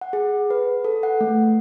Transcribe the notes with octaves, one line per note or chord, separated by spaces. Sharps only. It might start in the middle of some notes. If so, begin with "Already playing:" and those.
F#5
G#4
B4
A4
F#5
A3